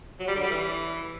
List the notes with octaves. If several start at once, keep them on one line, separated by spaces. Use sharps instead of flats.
F#3
G3
D3
G3
E3